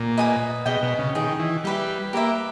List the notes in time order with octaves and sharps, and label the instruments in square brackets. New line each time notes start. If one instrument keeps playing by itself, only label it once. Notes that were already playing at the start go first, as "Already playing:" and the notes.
Already playing: [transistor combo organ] A#2
[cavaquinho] B4 D#5 G#5 D#6
[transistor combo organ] B2 [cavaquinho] G#4 D#5 G5
[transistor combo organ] B2
C#3
[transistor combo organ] D#3 [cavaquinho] G#4 D#5 G5
[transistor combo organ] E3
[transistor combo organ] G3 [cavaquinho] G4 B4 E5
[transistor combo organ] A#3 [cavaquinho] G4 B4 E5